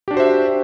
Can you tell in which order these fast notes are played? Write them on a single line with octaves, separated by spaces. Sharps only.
G4 D4 F#4 C5 E5